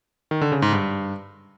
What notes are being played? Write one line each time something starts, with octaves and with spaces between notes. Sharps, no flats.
D#3
D3
C#3
G#2
G2